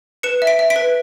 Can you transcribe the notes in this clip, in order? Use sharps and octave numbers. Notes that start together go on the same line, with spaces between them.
B4 C#7 E7
E5
B6 D7
E5
B6 D7
B4